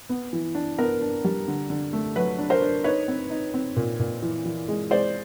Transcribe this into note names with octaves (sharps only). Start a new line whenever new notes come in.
B3
E3
D4
B3 A#4
D4
G3
D3
D3
A3
F#3 B4
D4
A#4 C5
D4
D#4 B4 C#5
C4
D#4
C4
A#2
A#2
E3
E3
G#3
G#3 C5 D5